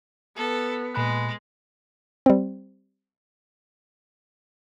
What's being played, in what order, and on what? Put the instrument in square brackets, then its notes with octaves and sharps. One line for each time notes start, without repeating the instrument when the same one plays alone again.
[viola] B3 [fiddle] A4
[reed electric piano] A#2 B5 F#6 [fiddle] G#3
[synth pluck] G3 C4